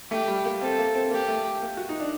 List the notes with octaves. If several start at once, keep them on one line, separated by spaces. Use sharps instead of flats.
A3 G4
G3
A#3
C4 A4
A#3
C4
A#3 G4
A3
A#3
F#4
D#4
D4